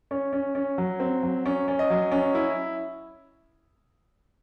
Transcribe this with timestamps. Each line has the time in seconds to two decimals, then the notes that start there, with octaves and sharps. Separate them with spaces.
0.11 C#4 C#5
0.33 C#4
0.55 C#4
0.78 F#3
1.00 C4
1.23 F#3
1.46 C#4
1.68 C#4
1.79 D#5
1.90 F#3
2.12 C#4
2.35 E4